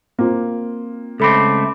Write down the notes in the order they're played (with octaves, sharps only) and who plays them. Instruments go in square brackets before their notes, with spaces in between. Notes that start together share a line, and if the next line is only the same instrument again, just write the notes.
[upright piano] A#3 C4 F4
[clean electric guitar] C#2 A3 C4 [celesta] A4 B5 D6